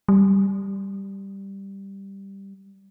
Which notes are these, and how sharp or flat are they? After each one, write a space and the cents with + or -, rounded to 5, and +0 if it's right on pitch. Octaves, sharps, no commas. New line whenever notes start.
G3 +0